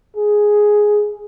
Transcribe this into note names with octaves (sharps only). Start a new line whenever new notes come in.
G#4